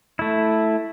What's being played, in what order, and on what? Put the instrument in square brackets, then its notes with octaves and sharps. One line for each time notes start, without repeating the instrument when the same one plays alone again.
[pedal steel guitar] A3 E4